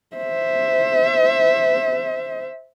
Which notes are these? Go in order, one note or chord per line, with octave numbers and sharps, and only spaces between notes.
C5 E5